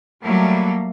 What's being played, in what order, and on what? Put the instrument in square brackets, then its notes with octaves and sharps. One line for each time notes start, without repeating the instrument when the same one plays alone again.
[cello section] F#3 G3 A3 A#3